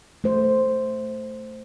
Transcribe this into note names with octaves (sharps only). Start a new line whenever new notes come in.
A3 C5